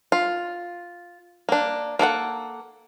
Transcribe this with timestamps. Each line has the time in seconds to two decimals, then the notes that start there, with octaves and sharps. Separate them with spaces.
0.12 F4
1.49 A#3 D4
1.99 A#3 A4 A#4 F#5